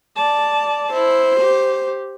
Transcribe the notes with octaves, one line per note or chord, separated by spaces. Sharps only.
D5 A5
E4 C5
G4